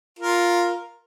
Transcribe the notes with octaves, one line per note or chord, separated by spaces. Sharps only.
F4 A#4